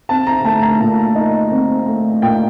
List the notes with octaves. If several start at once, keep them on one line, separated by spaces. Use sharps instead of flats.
C4 A5
A#5
A3 A5
A#5
A#2
D#4
C4
A3
A#2 G5